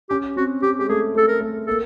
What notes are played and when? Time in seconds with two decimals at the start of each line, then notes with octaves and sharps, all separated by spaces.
0.10 C#4 G4
0.36 C4 F#4
0.63 C4 G4
0.79 G#3 G4
0.89 A3 G#4
1.15 A3 A4
1.28 A#4
1.41 A3
1.67 A#3 A4